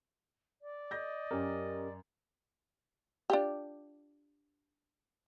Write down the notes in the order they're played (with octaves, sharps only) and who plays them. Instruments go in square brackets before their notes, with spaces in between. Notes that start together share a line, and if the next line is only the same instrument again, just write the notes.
[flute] D5
[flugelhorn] D#5 [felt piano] G6 A#6
[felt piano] F#2 [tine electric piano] C#4 G4 A#4
[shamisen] D4 F4 G4